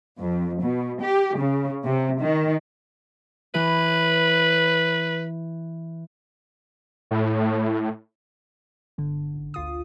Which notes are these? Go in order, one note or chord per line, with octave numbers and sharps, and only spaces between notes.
F2
B2
G4
C#3
C3
D#3
E3 B4
A2
G1 D3
A1
D2 F4 D#6